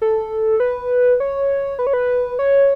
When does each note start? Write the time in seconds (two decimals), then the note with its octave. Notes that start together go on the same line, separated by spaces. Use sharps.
0.02 A4
0.60 B4
1.20 C#5
1.79 B4
1.87 C#5
1.93 B4
2.39 C#5